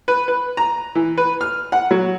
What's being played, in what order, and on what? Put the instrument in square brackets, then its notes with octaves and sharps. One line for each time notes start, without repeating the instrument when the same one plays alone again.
[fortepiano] B4
B4
A#5
E3
B4
F6
F#5
F#3